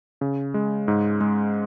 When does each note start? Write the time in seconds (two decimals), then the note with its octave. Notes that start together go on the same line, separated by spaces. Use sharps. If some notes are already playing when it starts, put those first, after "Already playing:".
0.21 C#3
0.54 G#3
0.88 G#2
1.20 G#3